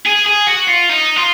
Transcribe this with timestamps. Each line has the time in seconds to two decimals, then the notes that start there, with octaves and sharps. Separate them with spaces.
0.06 G#4
0.26 G#4
0.47 F#4
0.68 F4
0.89 D#4
1.16 F4